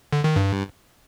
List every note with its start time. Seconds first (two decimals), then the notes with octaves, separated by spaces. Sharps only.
0.13 D3
0.24 D#3
0.36 G2